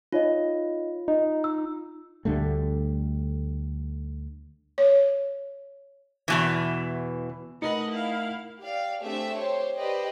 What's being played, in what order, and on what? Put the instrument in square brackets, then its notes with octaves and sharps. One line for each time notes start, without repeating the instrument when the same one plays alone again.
[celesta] D#4 C#5 D#5 [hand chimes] F4
[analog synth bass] D#4 [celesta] D#5
[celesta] E6
[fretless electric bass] D2 D3 G3 A3
[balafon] C#5
[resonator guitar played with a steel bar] E2 B2 E3
[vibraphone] A3 A#4 F#5 [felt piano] D#4 [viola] B4 D#5
[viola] E4 F5
[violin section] G4 D5 F5
A3 C4 D4 G4 G#4 E5
G4 C5 C#5
G4 B4 C5 D5 D#5 G5